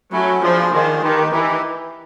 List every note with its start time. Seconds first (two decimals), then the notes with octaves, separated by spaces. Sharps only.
0.12 F#3 A3 C#4 E4
0.42 F3 D4 F4 G#4 C5
0.72 D#3 D4 F4 G#4 C5
1.02 D#3 D#4 G4 B4
1.32 E3 D#4 G4 B4